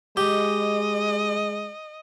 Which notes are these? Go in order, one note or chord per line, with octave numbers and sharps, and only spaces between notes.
G#3 G4 D#5